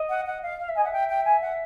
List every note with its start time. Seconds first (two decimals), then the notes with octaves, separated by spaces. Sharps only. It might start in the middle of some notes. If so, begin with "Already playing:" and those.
Already playing: D#5
0.10 F#5
0.27 F#5
0.43 F5
0.59 F5
0.69 E5
0.76 D#5 G#5
0.84 E5 F#5
0.93 G5
1.09 G5
1.25 G#5
1.42 F#5